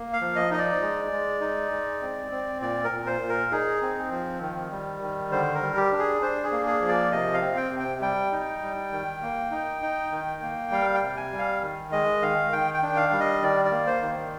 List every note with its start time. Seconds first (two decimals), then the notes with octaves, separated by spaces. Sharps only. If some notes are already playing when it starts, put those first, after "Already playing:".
Already playing: A#3
0.13 F5
0.21 F3
0.36 D#5
0.51 D#4 D#5
0.58 D5
0.82 G#3
1.12 G#3
1.41 D#4
1.71 G#3
2.02 C4
2.32 C4
2.61 A#2 D5
2.85 A#4
2.91 A#2
3.07 C5
3.22 A#2
3.29 A#4
3.52 D#4 G#4
3.82 C4
4.11 F3
4.41 D#3
4.71 G3
5.02 D#3
5.32 D3 C5
5.55 A#4
5.62 G3
5.77 G4
5.92 D4
5.99 G#4
6.22 D4 C5
6.44 G#4
6.52 A#3
6.67 G#4
6.82 F3
6.89 D5
7.12 C3 D#5
7.34 F5
7.42 C4
7.57 G5
7.71 C3
7.80 G5
8.01 G3 G5
8.32 D#4
8.62 G3
8.92 D#3
9.22 A#3
9.51 D#4
9.82 D#4
10.11 D#3
10.42 A#3
10.71 G3 F5
10.95 G5
11.02 C3
11.17 G#5
11.33 G3
11.39 F5
11.62 D#3
11.92 G#3 D#5
12.22 D#3 F5
12.52 D#3 G5
12.74 G5
12.83 D4
12.96 F5
13.12 G3
13.20 D#5
13.42 D#3 D5
13.65 D5
13.72 A#3
13.87 C5
14.02 D#3